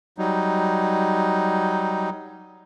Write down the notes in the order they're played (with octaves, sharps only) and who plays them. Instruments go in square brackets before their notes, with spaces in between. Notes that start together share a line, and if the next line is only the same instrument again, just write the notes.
[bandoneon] F#3 G3 D#4